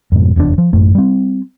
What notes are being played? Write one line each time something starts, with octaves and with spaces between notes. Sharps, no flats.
F2 G#2 B2
F1 E2 A2 D4
F3
A1 F#2 A2 A3
G3 C4